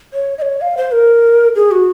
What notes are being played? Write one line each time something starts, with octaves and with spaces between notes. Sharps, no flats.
C#5
D#5
C#5
F5
C5
A#4
G#4
F#4